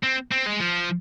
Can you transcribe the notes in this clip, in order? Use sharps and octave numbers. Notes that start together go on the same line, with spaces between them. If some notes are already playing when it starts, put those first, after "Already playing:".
C4
C4
G#3
F3